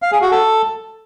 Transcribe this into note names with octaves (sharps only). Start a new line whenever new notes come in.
F5
G#4
F#4
A4